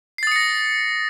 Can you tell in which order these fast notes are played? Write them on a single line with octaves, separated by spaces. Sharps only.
C7 A6 D#6 C#7 A#6